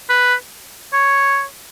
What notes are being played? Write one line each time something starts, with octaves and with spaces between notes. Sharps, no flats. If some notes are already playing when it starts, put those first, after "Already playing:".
B4
C#5